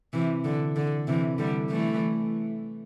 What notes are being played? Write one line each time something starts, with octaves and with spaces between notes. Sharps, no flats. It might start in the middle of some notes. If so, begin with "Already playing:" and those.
C3 E3
D3
D3
C3 E3
D3 G3
E3 A3